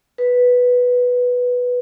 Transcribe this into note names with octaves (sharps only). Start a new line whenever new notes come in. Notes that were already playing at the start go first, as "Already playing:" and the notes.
B4